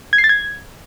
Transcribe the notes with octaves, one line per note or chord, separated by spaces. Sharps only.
G#6
C7
A6
G#6